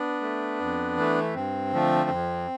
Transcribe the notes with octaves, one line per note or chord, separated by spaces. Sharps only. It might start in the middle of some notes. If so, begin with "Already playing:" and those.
Already playing: B3 D4
A3
F2
E3 A3
G2 C4
D3 F3 A3
F2